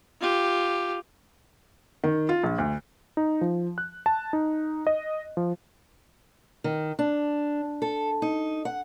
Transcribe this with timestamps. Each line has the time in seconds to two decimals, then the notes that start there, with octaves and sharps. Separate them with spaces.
0.21 F4 G4
2.04 D#3
2.29 F4
2.43 A#1
2.58 D2
3.17 D#4
3.41 F3
3.78 F#6
4.06 A5
4.33 D#4
4.87 D#5
5.37 F3
6.64 D#3
6.99 D4
7.82 A4
8.22 D#4
8.65 F#5